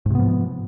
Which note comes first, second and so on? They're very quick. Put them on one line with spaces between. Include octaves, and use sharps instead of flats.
G#2 C3 B3 F3